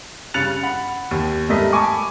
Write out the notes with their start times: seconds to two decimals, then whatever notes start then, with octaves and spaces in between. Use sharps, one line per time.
0.34 G2 C#3 F#6 A6 C#7 F7
0.63 F#5 B5
1.11 D#2
1.48 G#2 G3 A3 A#4 D#5 B6
1.73 G#5 A5 B5 C#6 D6